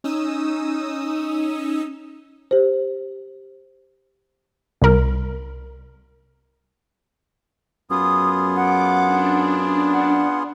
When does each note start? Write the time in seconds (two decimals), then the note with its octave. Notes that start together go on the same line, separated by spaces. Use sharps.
0.04 C#4 D#4 D#6 E6
2.51 G4 C5
4.82 C2 A#4
7.90 F#2 B3 F4 G#4 D#6
8.56 F#5 D6
9.05 D4
9.92 F#5